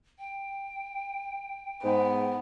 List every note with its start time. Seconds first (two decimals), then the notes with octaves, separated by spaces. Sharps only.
0.19 G5
1.83 G#2 B3